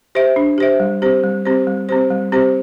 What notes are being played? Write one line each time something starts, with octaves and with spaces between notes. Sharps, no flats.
G4 C5 E5
D4
G4 C5 E5
G3
C4 G4 C5
G3
C4 G4 C5
G3
C4 G4 C5
G3
C4 G4 C5